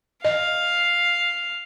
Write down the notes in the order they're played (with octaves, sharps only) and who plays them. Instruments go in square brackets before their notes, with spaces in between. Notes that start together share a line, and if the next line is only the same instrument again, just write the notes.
[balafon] D#5 [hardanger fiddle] F5